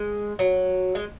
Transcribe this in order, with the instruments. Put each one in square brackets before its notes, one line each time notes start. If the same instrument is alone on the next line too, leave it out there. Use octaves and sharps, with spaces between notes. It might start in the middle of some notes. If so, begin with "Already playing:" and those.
Already playing: [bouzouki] G#3
F#3
G#3